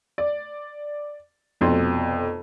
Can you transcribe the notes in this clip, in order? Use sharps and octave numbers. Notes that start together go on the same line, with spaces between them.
D5
F1 F2 B2 C6